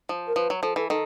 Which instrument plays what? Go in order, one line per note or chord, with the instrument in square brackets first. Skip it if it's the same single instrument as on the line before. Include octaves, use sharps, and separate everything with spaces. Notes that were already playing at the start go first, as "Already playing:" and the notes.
[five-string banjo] F3
[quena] A#4
[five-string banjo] F3 [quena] B4
[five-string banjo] F#3
[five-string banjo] F3 [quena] A4
[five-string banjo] E3 [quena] A4
[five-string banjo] D#3 [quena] A4